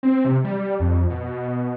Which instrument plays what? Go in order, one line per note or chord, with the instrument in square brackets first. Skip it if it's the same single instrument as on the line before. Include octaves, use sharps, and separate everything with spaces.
[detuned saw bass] C4
C3
G3
F2
B2